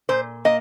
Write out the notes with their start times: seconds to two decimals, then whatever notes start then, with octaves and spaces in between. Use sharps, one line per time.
0.09 A#2 C5
0.45 A#3 D#5